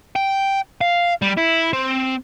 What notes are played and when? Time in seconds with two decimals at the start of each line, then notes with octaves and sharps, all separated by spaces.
0.16 G5
0.81 F5
1.22 G3
1.37 E4
1.73 C4